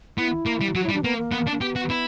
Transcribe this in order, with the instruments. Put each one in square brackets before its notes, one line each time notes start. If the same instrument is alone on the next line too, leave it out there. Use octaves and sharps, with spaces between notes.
[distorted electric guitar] B3 [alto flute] E4
[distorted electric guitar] A#3
G3
[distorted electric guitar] F#3 [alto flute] F#4
[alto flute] E4
[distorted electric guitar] G3
[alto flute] D4
[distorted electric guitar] A#3 [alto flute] B3
[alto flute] A#3
[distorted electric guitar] B3
D4
[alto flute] A#3
[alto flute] B3 [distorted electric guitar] G4
[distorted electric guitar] F#4
E4